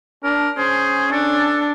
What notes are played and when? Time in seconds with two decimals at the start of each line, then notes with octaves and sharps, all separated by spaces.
0.24 D4 A#4
0.58 C#4 G#4 C5
1.12 D4 A4